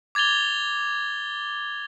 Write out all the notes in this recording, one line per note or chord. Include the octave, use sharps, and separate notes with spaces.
D6 G#6 A6 F7 G7